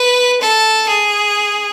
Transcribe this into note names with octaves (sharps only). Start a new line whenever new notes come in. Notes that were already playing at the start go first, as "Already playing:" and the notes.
Already playing: B4
A4
G#4